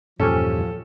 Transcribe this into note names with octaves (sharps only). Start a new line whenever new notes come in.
E2 G2 A#2 F3 C#4 G4 A4 G#5